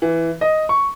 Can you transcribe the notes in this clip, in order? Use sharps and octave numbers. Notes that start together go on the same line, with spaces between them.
E3
D#5
C#6